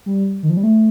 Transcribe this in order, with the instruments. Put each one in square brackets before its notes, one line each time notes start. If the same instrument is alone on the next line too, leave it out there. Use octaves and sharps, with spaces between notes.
[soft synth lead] G3
D#3
F3
G3
A3